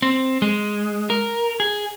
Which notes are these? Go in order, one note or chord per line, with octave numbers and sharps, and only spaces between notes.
C4
G#3
A#4
G#4